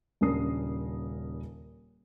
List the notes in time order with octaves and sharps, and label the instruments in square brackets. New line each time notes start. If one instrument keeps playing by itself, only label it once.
[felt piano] D#1 C#3 D4 A#4 D#6 C7